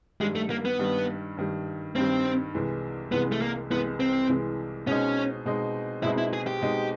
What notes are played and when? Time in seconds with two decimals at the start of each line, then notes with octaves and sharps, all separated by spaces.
0.21 G2 D#3 G3 G#3
0.36 A3
0.50 A#3
0.65 B3
0.79 G2 D#3 G3
1.37 G2 D#3 G3
1.96 G2 D#3 G3 C4
2.54 C2 C3 E3 G#3
3.12 C2 C3 E3 G#3 B3
3.32 A3
3.42 A#3
3.71 C2 C3 E3 G#3 B3
4.00 C4
4.29 C2 C3 E3 G#3
4.87 B2 G#3 C4 C#4 D#4
5.45 B2 G#3 C4 D#4
6.03 B2 G#3 C4 D#4 E4
6.18 E4
6.33 G#4
6.47 G4
6.61 B2 G#3 C4 D#4